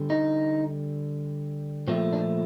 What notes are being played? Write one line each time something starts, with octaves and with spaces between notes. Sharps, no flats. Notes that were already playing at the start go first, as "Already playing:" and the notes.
Already playing: D3 G3
D#4
A#2 F3 A3 C4
D4